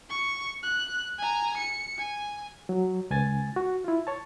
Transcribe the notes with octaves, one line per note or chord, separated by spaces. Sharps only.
C#6
F#6
G#5 A#5
C#7
G#5
F#3
C#2 G#5 A6
F#4
E4 F4
C#5 A5